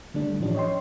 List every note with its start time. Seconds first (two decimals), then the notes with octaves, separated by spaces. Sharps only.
0.14 D3 G3 A3 D4
0.40 A2 E3 F3 C#4 D4 G4
0.55 C#5 D#5 G5 C6